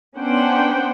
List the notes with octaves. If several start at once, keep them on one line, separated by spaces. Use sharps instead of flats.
B3 C#4 D4 C5 F#5 G5